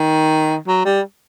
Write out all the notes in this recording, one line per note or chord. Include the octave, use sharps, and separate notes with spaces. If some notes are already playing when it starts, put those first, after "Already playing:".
Already playing: D#3
F#3
G3